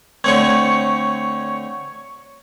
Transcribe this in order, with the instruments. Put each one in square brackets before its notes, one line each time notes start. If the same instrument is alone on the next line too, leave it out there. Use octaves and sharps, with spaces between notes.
[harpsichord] D3 A3 C4 [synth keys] C#5 C#6